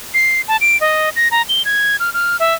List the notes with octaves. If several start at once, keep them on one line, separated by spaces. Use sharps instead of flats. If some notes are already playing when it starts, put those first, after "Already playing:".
C7
A5
D7
D#5
A#6
A#5
G7
G#6
F6
F6
E5